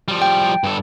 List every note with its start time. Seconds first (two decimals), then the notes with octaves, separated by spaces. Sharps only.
0.08 F3 G3
0.22 G5
0.64 G2 A4